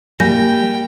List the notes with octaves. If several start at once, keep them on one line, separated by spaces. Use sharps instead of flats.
G3 A#3 G5 G#5 G6 A#6